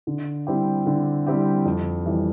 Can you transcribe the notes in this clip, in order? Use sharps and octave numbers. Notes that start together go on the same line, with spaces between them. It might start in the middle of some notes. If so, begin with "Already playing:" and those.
D3
G3 C4 E4 G4
D3
G3 C4 E4 G4
F2
E3 G3